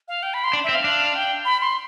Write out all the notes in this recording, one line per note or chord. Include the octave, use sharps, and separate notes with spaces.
F5
G5
B5
C6
D4
C4 E5
F5
D4
G5
B5
C6